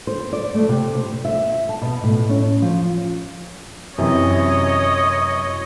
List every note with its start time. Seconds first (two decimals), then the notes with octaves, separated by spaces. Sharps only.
0.07 C5
0.33 D5
0.55 A3
0.69 C3
0.95 C5
1.25 E5
1.69 A5
1.82 B2
2.04 A2
2.29 C#4
2.62 F3
3.98 F#2 C3 E3 C#5 D#5